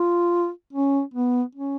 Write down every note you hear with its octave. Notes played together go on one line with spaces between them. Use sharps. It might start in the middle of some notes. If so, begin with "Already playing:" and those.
Already playing: F4
C#4
B3
C#4